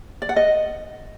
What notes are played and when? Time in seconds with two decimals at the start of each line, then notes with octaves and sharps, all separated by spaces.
0.22 D5
0.29 F#5
0.36 D#5